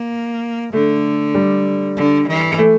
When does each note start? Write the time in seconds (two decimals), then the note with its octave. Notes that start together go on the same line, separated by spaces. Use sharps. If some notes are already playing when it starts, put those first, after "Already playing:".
Already playing: A#3
0.73 D3 A3
1.35 G3
1.96 D3
2.27 E3
2.58 A3